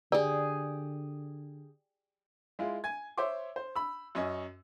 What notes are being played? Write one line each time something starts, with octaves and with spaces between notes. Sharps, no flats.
D3 G4 G#4 D5
G#3 E4 F4
G#5 G#6
C5 C#5 E5 C6 D6
C5
B5 E6
F#2 C#4 D#5